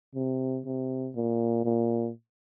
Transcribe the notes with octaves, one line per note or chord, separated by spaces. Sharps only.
C3
C3
A#2
A#2